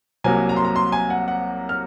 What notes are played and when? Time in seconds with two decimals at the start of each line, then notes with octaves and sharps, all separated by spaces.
0.24 C2 C3 F#3 A#3 G#5
0.49 A#5
0.56 C6
0.65 A#5
0.76 C6
0.92 G#5
1.10 F#5
1.28 F#5
1.69 F6